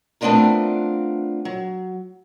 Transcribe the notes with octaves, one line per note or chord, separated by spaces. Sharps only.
A3 B3 C4 D4 F4 A#4
F#3